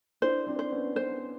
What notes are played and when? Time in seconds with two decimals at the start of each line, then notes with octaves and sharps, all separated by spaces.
0.22 D4 E4 C5
0.47 C4 D4
0.59 C5
0.72 B3 C#4
0.96 B3 C#4 C5